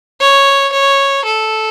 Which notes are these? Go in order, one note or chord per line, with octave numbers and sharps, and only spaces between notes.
C#5
C#5
A4